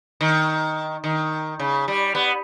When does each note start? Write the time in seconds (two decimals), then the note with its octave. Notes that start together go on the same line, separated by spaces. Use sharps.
0.21 D#3
1.04 D#3
1.59 C#3
1.88 G3
2.15 B3